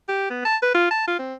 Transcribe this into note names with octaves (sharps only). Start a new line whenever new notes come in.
G4
B3
A5
B4
F4
A5
F4
C4